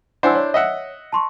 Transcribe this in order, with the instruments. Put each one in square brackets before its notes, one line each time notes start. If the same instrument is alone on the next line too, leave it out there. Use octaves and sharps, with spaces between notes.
[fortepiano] D4 E4 C5 [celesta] F#5 G#5 E6
[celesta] C#5
[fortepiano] D#5 E5 F#5
[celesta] A5 C6 C#6